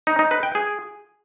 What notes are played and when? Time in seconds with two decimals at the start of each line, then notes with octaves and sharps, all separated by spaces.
0.07 D#4
0.19 D#4
0.31 B4
0.43 G5
0.55 G#4